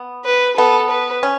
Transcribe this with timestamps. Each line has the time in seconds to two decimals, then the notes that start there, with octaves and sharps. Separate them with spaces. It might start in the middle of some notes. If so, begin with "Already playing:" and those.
Already playing: B3
0.25 B4
0.57 B3 A4
0.90 B4
1.23 C#4